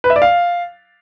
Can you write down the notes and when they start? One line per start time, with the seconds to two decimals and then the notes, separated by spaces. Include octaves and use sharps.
0.04 B4
0.10 E5
0.16 D5
0.22 F5